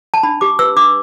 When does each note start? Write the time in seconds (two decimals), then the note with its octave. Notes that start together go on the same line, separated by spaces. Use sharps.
0.14 A5
0.23 D4 B5
0.41 G4 D6
0.59 B4 E6
0.76 D4 D6